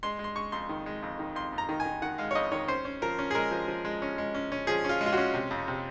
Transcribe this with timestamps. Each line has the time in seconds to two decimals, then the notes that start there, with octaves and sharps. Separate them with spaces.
0.03 G#3 C6
0.19 G#3
0.24 C6
0.36 G#3 C#6
0.52 F2 C6
0.69 D#3
0.86 G#3
1.02 F2
1.19 D#3
1.35 F2 C6
1.53 F2
1.58 A#5
1.69 D#3
1.80 G#5
1.86 D#3
2.02 D#3 F#5
2.18 G#3 F5
2.31 C#5
2.35 F2 D#5
2.51 D#3 C#5
2.68 C#4 C5
2.85 C#4
3.02 F3 A#4
3.19 C#4
3.31 G#4
3.35 G#3 A#4
3.51 F3
3.68 F3
3.85 G#3
4.02 C#4
4.18 G#3
4.34 C#4
4.52 C#4
4.67 F3 G#4
4.84 C#4 F4
5.01 G#3
5.06 F4
5.13 C#4 F#4
5.34 C3
5.51 F2
5.68 C3